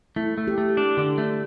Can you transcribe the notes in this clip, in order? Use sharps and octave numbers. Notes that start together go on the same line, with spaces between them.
A3 E4
A3
G4
A3
D4
D3
A3